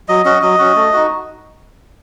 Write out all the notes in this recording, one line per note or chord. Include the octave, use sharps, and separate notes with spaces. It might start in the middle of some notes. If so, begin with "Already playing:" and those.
F#3 D#5
C#4 F#4 D#5
F#3 D#5
C#4 F#4
A3
D#4 F#4